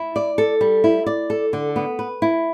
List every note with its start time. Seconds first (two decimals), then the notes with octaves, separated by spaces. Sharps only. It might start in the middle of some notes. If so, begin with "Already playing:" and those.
Already playing: E4
0.16 D5
0.38 A4
0.61 G3
0.84 E4
1.06 D5
1.30 A4
1.53 D3
1.76 B3
1.99 B4
2.22 E4